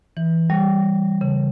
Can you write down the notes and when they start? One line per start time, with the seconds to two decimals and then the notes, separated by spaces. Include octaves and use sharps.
0.17 E3
0.50 G3
1.21 C#3